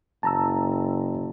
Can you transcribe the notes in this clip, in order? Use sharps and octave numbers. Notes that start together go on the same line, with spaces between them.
F#1 A5 A#5 E6